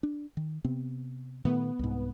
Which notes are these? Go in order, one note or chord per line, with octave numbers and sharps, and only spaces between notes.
D4
D#3
C3 B3 C4
A#2 D#3 A3 B3
C2 G#2